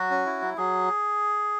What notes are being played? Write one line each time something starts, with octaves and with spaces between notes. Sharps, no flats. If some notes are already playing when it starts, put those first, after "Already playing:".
Already playing: F#3 F#4
C#4
E4
F#3
F#3 G#4